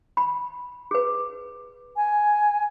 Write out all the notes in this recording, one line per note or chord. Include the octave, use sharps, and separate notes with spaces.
B5
G#4 B4
G#5